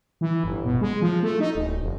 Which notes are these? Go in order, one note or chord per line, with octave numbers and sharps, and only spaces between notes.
E3
G1
B2
G#3
F3
A3
D#4
D1
F1